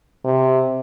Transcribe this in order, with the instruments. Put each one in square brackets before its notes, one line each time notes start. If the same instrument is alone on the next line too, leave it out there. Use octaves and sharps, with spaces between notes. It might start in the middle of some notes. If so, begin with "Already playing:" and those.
[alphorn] C3